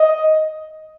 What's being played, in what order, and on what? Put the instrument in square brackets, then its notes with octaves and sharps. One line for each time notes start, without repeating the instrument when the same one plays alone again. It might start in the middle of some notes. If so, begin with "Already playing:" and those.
Already playing: [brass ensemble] D#5